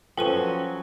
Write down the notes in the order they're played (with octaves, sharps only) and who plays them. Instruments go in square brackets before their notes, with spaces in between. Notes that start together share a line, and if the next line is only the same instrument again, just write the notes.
[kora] F3 C#4 [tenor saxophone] F#3 [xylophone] A4 B4 D#7 [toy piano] G5